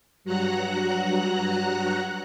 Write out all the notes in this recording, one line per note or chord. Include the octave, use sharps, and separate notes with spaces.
G2 F#3 F#4 F#5 A#5 F#6